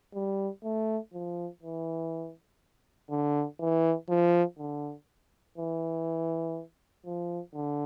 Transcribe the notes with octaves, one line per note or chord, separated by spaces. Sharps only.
G3
A3
F3
E3
D3
E3
F3
D3
E3
F3
D3